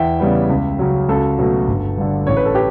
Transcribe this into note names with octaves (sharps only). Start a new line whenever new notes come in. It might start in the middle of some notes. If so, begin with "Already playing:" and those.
Already playing: E2 E5 G5
C#3 G3 B3
C#2
C#3 F#3
C#2 F#4 A4
B2 F#3 A3
G1
G2 D3
A1 C#5
B4
A4
G4 B4